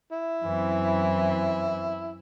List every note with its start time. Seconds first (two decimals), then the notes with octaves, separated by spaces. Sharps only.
0.12 E4
0.44 F#2 E3 C4